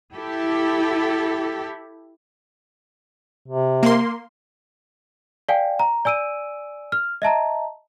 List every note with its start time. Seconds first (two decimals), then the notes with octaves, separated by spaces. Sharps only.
0.14 E4 G4 A4
3.48 C3
3.83 A#3 C6
5.49 D5 F5 G5 G#5
5.79 A#5
6.05 D5 G#5 E6 D7 D#7
6.92 F6
7.22 D#5 E5 A5 A#5